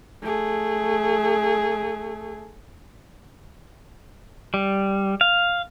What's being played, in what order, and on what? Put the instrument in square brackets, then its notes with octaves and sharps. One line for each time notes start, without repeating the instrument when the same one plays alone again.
[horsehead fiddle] A3 G#4
[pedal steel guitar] G3
F5